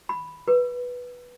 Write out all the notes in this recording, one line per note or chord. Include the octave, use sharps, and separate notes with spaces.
B5
B4